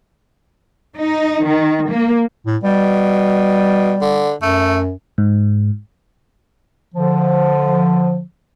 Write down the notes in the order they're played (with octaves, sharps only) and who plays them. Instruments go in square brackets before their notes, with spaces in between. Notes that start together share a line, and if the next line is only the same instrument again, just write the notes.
[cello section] D#4
D#3
A#3
[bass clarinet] A2
[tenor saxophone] B2 [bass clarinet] G3
[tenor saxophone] D3
[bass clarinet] F#2 [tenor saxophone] A3
[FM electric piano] G#2
[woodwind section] D3 F3